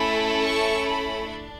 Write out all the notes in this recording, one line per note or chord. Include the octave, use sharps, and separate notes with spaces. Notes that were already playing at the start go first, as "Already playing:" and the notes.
Already playing: A3 C#4 E4 A4 B5
C#6
B5
D4